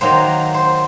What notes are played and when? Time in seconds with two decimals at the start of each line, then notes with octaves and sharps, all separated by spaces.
0.01 D#3 F#3 A#3 C5
0.54 C5